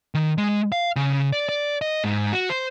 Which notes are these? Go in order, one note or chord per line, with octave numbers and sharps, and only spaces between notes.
D#3
G#3
F5
C#3
D5
D5
D#5
G#2
F#4
C5